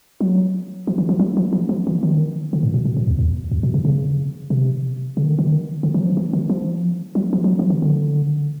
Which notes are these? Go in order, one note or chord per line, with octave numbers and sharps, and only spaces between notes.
F#3
F3
E3
F3
F#3
F3
F3
F3
E3
D#3
D3
A2
A#2
B2
A#2
E2
E2
F2
B2
C3
C#3
C3
C#3
D#3
D3
D#3
D3
E3
F#3
F3
E3
D#3
F3
F#3
F3
F3
F#3
F3
D#3
D3